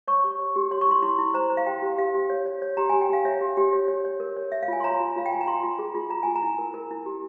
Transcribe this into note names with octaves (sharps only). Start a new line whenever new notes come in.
C#5 C#6
G4
C#5
G4
C#5 C6
C#6
E4 C6
E4 C6
E4
C5 A#5
C5
F5
G4 G5
G4
G4 F5
G4
C#5
C#5
C#5
G4 A#5
G4 G#5
G5
G4 F5
C#5 E5
G4
G4
C#5
C#5
C#5
A#4
C#5
C#5 E5
F5
F4 G#5
C6
C#5 A#5
F4
F4 F5
G5
F4 G#5
A#5
F4 C6
F4
G#4
F4
F4 A#5
F4 G#5
A#5
E4
A#4
A#4
E4
G4